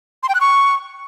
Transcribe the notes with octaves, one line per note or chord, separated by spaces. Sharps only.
C6
G5
F#6
C#6